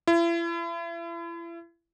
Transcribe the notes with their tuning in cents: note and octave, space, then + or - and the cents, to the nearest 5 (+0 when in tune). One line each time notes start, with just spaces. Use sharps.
E4 +40